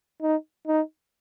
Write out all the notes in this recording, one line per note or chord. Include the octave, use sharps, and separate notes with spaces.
D#4
D#4